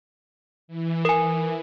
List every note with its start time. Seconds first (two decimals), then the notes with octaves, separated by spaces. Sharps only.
0.68 E3
1.05 A#4 G#5